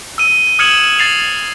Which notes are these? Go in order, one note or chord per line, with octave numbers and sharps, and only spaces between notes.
E6 D#7
D#6 F6 G#6 C#7 E7 F#7
A6 C7 F7